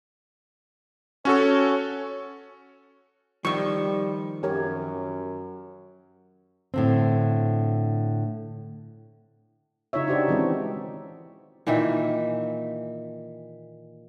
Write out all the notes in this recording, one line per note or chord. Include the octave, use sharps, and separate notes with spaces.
C#4 F#4 A4 C#5
D#3 F3 G3 C#6 E6
F#2 G4 A#4 C#5
A2 D3 C4
C#3 D#4 F4 C#5 E5
D4 D#4 F#4 G4 C5 D5
D#3 E3 G#3 C4 C#4
A#2 D#3 E3 E5